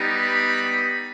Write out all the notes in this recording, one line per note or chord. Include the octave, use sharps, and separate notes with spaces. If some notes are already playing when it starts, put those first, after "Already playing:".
Already playing: G3 B3 D#4 G4
B5